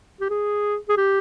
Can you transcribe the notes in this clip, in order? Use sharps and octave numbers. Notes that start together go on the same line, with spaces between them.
G4
G#4
G#4
G4